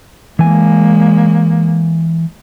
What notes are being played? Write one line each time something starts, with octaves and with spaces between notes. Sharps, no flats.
E3 G#3 A#3 G#5